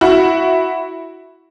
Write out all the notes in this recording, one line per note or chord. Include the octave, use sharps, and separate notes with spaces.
E4 F#4